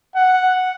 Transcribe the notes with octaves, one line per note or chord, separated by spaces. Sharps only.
F#5